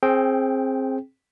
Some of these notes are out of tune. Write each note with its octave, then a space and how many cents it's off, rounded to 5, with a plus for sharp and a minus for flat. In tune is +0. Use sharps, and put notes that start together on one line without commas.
C4 +20 G#4 +15 G5 -5